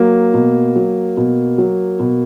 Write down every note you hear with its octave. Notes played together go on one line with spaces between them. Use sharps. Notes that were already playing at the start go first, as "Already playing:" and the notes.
Already playing: F#3 A#3
B2
F#3
B2
F#3
B2